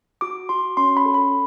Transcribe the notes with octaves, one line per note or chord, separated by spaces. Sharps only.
F#4 D6
F#4 C6
C#4 C6
B5
A4
B5